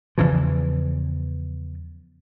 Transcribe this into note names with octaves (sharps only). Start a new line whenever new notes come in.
E2 C#3 E3 F3